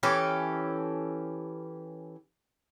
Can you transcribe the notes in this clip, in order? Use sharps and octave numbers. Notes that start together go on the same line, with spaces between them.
E3 C#4 G4 A4